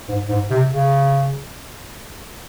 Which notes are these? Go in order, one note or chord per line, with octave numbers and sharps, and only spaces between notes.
G#2
G#2
C3
C#3